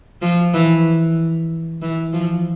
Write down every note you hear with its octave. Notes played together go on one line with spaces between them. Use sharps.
F3
E3
E3
F3